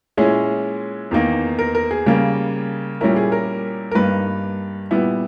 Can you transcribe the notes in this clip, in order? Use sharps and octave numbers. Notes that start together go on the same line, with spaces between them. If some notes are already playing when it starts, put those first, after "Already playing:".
A#2 G#3 C#4 E4 G#4
E2 D#3 A#3 D#4
A#4
A#4
G#4
C#3 G3 A#3
A#2 G3 C#4 E4 A#4
G#4
A#4
A#4
G2 G3 A#3 D#4 B4
A#2 G3 B3 E4